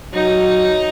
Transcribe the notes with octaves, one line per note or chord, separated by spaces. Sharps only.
F#3 D#4